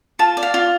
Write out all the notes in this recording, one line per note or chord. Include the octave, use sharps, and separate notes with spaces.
F4 A5
D5
F5
F4